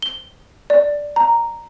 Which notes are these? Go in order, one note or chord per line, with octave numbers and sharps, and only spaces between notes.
G7
D5
A#5